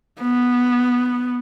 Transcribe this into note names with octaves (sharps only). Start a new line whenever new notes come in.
B3